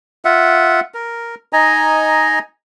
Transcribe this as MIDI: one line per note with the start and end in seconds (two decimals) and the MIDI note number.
0.25 0.80 65
0.25 0.80 76
0.25 0.80 78
0.94 1.35 70
1.53 2.39 63
1.53 2.39 75
1.53 2.39 80
1.53 2.39 82